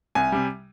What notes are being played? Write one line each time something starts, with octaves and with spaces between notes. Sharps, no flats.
C2 G#5
C3 G3